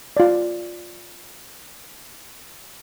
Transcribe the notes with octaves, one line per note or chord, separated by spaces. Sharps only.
F4 D5